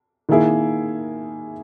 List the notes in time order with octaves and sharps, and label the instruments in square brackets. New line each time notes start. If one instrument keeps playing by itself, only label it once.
[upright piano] D#3 A#3 E4 G#4